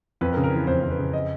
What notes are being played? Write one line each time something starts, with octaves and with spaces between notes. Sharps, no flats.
F2 B4
A#4
C#3
A#4
E3 B4
F2 C5
F2
B4
C#3
D#5